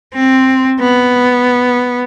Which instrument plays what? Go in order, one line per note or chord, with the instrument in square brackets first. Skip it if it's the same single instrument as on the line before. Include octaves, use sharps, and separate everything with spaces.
[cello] C4
B3